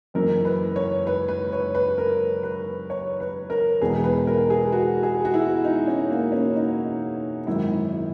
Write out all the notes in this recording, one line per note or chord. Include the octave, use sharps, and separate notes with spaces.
F#1 F#2 E3 A#4
B4
C#5
B4
B4
C#5
B4
A#4
B4
C#5
B4
A#4
E1 E2 B2 G#4
B4
A#4
G#4
F#4
G#4
F#4
E4
D#4
C#4
A#3
C#4
D#4
G#1 F#2 D#3 E4